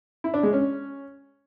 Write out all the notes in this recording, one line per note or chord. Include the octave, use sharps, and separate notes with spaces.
E4
D4
G#3
C#4